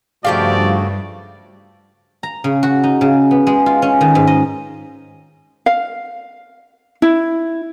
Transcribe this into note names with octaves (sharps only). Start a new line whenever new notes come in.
G2 C#3 F3 A3 F#4 G4 D5 F5
A#5
C#3
F#4
D#4
C#3
B3
G#3
F4
C#4
D#3
G#2
D#5
F5
E4